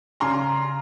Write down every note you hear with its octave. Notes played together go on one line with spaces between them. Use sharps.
C#3 A#5 C6